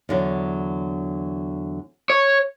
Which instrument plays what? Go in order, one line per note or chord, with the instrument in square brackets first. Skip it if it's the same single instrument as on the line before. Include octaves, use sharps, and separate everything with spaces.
[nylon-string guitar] E2 D3 F#3
[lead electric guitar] C#5